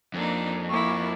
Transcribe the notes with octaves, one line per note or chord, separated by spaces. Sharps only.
F2 A#3 D4 D#4
A#3 E4 F#4 A#4 C#6 D6